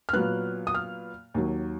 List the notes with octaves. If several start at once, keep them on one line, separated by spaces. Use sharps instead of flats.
F6
A#2 F#3 B3 F#6
D#6
F6
D#2 D#3 F#3